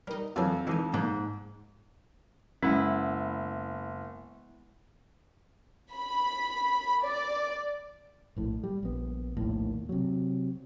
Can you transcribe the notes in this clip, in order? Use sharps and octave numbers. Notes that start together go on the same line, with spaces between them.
G3 D#4 A#4
F2 D3 E3 F#3 F4 G#5
G#2 D3 E3 F3 D#4 G#5
A#1 G#2
F#1 G#3 B3 C#4 E4
B5
D5
A#1 A2
G3
A#1 B3
A#1 D#2 A2
C3 F#3